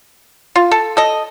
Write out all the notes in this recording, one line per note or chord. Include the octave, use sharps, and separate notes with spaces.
F4
A4
A4 D#5